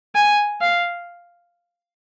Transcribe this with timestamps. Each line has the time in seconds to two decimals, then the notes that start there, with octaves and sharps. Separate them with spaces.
0.15 G#5
0.61 F5